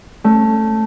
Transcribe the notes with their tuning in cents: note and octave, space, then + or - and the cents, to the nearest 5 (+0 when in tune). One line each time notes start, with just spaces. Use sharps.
A3 +0 C#4 -25